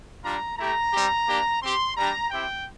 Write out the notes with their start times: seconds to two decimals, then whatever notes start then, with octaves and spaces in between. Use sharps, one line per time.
0.23 G3 D4 F4 A#5
0.58 A3 E4 G4 A#5
0.93 G3 C4 G4
1.27 A#3 D4 G4
1.62 C4 G4 C6
1.97 G3 D4 G4 A#5
2.31 C4 E4 G4 G5